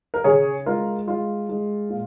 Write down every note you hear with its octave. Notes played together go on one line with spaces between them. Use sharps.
A#4
C#3 G#4 C#5
G#3 F4 A#4
G#3 F4
G#3
A#2